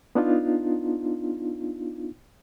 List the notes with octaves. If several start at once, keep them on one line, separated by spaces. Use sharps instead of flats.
B3 D4 D#4 F4